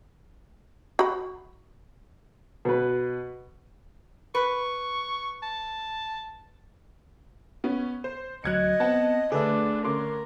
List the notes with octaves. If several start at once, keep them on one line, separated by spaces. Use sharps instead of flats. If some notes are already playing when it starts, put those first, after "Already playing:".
F#4 B5
B2 B4
B4 C#6
A5
B3 C#4
C5
D2 F#3 D#5 F#6 G#6 C#7
B3 C4 F#5 A5
D3 A3 D4 G#4 B4 E5
D3 C#4 A#4 C6 D6